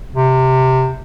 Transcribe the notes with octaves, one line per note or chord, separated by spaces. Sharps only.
C3